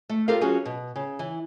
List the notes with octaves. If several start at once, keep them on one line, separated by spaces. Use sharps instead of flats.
A3
F4 G4 A4 A#4 C5 F5
F#3 C#4 F4 F#4 G#4
B2
C#3
E3